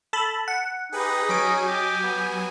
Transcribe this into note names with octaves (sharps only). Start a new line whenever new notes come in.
A4 A5 B5
F#5
D#4 G4 G#4 B4
F#3 C#4 G#4 G#5 B6 D7
G4 D#5 D6
B3